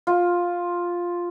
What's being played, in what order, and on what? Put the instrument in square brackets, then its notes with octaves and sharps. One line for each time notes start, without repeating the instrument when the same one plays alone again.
[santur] F4